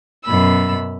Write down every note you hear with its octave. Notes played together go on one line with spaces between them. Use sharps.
F#2 B2 B5 E6